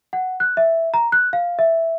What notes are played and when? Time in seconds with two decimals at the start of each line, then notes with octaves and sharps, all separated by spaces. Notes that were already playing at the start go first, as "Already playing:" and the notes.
0.13 F#5
0.40 F#6
0.57 E5
0.94 A#5
1.12 F#6
1.33 F5
1.59 E5